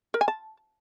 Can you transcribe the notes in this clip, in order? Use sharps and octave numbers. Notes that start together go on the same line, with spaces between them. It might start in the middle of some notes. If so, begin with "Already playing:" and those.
A#4
G#5
A5